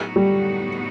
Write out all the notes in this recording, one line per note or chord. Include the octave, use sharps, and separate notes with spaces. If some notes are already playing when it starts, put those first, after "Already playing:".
Already playing: A2 F#3 B3 D#4 F#4
G3